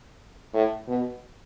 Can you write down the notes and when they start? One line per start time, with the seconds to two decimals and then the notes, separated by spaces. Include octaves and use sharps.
0.54 A2
0.88 B2